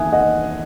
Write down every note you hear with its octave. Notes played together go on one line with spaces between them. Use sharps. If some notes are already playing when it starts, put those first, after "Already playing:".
Already playing: E2 D#3 A#3 E5 G#5 D#6 F#6
D#5 F#5